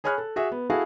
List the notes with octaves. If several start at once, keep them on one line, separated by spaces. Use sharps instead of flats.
G#4 C#5 G#5 B5 F6 F#6
A4
F#4 G#4 E5
B3
E4 F#4 G#4 A4 F5